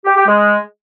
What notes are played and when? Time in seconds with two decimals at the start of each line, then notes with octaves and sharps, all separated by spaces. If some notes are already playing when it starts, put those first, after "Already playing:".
0.05 G4
0.16 G4
0.27 G#3